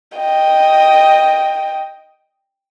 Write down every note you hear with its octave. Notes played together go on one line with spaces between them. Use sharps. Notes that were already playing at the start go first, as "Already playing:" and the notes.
D#5 G5